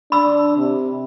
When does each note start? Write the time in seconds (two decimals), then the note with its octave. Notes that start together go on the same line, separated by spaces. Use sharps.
0.12 D4 B5 E6
0.57 C3